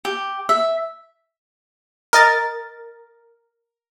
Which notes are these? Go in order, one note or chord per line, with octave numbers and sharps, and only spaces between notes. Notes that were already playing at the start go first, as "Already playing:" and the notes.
G4
E5
A#4 D#5 A6